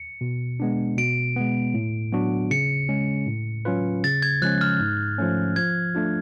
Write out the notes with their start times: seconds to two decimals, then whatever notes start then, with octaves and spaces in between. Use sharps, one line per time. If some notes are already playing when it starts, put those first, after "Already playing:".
Already playing: C#7
0.21 B2
0.60 G#3 B3 D4
0.98 B2 D7
1.36 G#3 B3
1.74 A2
2.13 F#3 B3 D4 F#4
2.50 C#3 C#7
2.89 G#3 C#4
3.27 A2
3.65 F#3 C#4 F4 B4
4.04 C#3 A6
4.22 G#6
4.42 F3 G#3 C#4 F#6
4.61 F6
4.80 G#2
5.18 F3 A3 C#4
5.56 F3 G#6
5.95 A3 D4 F4